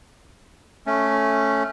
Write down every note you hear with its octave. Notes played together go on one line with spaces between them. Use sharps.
A3 C#4